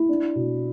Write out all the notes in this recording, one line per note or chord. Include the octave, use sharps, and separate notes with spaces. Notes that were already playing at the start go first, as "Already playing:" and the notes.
Already playing: E4
D4
B2